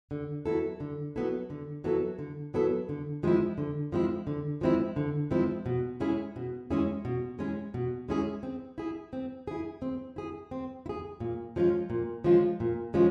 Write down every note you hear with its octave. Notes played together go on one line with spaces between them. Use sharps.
D3
F#3 B3 E4 A4
D3
F#3 B3 E4 A4
D3
F#3 B3 E4 A4
D3
F#3 B3 E4 A4
D3
F3 G#3 C4 E4
D3
F3 G#3 C4 E4
D3
F3 G#3 C4 E4
D3
F3 G#3 C4 E4
B2
G#3 C#4 E4 G#4
B2
G#3 C#4 E4 G#4
B2
G#3 C#4 E4 G#4
B2
G#3 C#4 E4 G#4
C4
E4 G#4
C4
E4 G#4
C4
E4 G#4
C4
E4
G#4
A#2
F3 G#3 C#4 F4
A#2
F3 G#3 C#4 F4
A#2
F3 G#3 C#4 F4